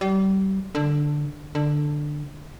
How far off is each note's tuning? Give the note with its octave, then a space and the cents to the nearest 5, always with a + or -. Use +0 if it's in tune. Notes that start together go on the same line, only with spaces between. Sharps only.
G3 -30
D3 +5
D3 +10